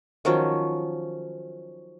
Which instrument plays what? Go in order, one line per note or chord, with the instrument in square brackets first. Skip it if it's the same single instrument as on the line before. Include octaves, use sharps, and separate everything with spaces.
[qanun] D#3 F3 F#3 C#4